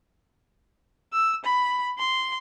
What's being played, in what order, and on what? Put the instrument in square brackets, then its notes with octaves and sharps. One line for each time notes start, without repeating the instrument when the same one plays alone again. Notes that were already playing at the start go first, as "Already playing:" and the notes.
[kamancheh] E6
B5
C6